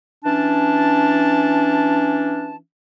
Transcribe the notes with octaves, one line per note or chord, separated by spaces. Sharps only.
E3 C#4 D4 A5